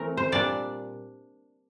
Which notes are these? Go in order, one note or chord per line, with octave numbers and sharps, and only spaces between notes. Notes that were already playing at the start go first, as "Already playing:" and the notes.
Already playing: E3 A3 C4 A#4
C5
A#2 G3 D4 D5